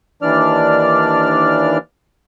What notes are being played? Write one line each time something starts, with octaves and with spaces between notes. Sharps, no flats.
D#2 E3 D4 D5 F6